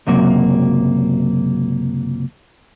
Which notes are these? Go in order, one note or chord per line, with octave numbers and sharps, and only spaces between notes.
C#2 F#2 C3 F#3 A#3